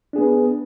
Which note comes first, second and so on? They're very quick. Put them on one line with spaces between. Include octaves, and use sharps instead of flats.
D4 G#4 B3 B4